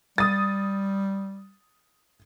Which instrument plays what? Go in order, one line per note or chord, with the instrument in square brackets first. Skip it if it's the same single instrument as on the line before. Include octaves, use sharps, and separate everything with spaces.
[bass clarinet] G3 [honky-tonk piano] D#6 A6